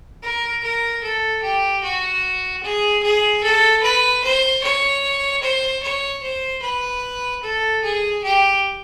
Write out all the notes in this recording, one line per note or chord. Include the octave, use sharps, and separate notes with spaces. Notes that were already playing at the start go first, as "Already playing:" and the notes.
A#4
A#4
A4
G4
F#4
G#4
G#4
A4
B4
C5
C#5
C5
C#5
C5
B4
A4
G#4
G4